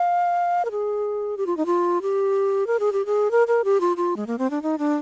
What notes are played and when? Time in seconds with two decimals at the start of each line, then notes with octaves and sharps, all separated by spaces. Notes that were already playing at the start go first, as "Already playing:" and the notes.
Already playing: F5
0.65 A#4
0.71 G#4
1.37 G4
1.46 F4
1.57 D#4
1.66 F4
2.02 G4
2.67 A#4
2.80 G#4
2.93 G4
3.06 G#4
3.31 A#4
3.47 A#4
3.64 G4
3.81 F4
3.97 F4
4.17 G#3
4.27 A#3
4.38 C4
4.50 D4
4.62 D#4
4.79 D4